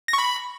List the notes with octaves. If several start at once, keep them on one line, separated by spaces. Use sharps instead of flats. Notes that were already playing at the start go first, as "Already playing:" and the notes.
A#6
C#6
B5